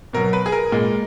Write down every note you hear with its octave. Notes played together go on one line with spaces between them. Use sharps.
B2 F#3 A#4
B4
G#4
A#4
A#2 G#3